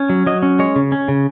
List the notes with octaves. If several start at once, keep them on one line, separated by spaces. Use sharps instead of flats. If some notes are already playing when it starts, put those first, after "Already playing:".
Already playing: C#4
F#3
F#3 D#5
C#4
G#3 C#5
C#3
C#4
C#3